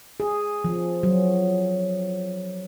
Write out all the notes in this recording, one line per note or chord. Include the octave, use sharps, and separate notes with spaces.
G#4
F3
F#3